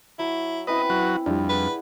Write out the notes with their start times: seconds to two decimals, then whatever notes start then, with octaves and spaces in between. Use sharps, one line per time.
0.19 F#3 E4 C#6
0.67 C4 C#4 E4 B4 D#5
0.90 F#3 F#4
1.26 F2 G3 D4 E4 G4 B5
1.49 G#4 B4 D5 F#5